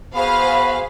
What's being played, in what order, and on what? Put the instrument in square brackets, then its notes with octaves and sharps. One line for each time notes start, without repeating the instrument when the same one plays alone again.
[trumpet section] B3 F#4 B5 [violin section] G#4 C5 F5